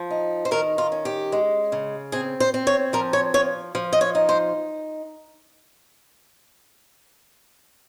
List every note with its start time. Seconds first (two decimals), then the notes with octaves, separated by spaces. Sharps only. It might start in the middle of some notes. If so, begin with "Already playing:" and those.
Already playing: F3
0.11 D#4
0.45 C5
0.51 D#3 A#4
0.78 F4
0.92 C#4
1.05 G4
1.32 G#3
1.72 C#3
2.12 C4 G#4
2.40 C5
2.54 C4
2.67 C#5
2.93 F3 A#4
3.13 C#5
3.34 F3 C#5
3.75 F3
3.93 D#5
4.01 C#5
4.15 D#4
4.29 C5